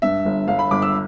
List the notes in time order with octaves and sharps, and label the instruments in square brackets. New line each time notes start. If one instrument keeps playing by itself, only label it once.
[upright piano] G2 E5
G1
G1 F5
B5
G1 D6
E6